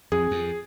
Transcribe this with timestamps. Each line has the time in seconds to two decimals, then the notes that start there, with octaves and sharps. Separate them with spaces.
0.12 F2 G#4
0.31 F2